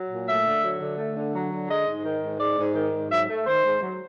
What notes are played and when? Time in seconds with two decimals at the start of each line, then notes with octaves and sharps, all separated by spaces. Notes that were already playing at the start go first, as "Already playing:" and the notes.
Already playing: F#3
0.10 A#2
0.27 A3 E5
0.45 D3
0.63 F#3
0.80 D3
0.98 A3
1.16 D3
1.33 F#3
1.52 D3
1.69 G#3 D#5
1.86 G#2
2.04 D#3
2.23 G#2
2.40 G#3 D5
2.57 G#2
2.75 D#3
2.93 G#2
3.10 F#3 E5
3.28 A3
3.46 D#3 C5
3.64 G#2
3.82 F#3